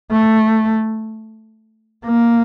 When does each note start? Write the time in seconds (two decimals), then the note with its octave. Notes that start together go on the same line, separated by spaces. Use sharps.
0.11 A3
2.05 A#3